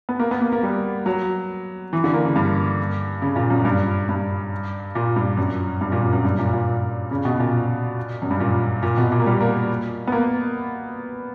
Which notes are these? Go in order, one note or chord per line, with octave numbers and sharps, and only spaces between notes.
B3
A#3
B3
A#3
A#3
G3
F#3
E3
D3
A#3
C#3
G2
C#3
A#2
F#2
G2
G2
A#2
G2
F#2
G2
A#2
F#2
F#2
G2
A#2
A#2
C#3
B2
A#2
F#2
G2
A#2
A#2
B2
A#2
A#3
G3
A#3
B3
A#3